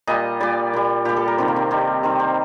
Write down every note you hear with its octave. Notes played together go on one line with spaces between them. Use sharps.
A#2 G3 D#5
A#2 G3 D5
A#2 G3
A#2 G3 G4
A4
A#4
C3 D#3 G3 C4
A#3
C4
C3 D#3 G3
C3 D#3 G3 C4
C4